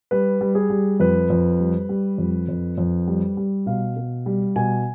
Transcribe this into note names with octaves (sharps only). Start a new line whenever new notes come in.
G3 B4
G3
G#4
G3
F2 B4
F2
G3
G3
F2
F2
F2
G3
G3
B2 F5
B2
G3
B2 G#5